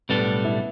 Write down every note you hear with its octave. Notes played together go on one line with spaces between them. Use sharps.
B1 A2 G3 B3 D4 A4
E4